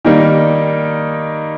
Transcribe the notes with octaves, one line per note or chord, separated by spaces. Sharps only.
D#3 G3 A#3 D#4